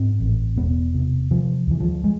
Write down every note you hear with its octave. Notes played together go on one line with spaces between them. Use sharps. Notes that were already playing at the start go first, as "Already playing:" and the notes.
Already playing: G#2 C4
A1
E1 B3
C3
C3 F3
D2 E3
F3
G#3